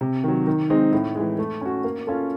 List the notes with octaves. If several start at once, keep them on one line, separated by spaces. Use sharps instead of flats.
C3
D#3 F#3
D#3
G#3 C4 D#4
A2
E3 G#3
A3
C#4 F#4
A#3
C#4 F4 A4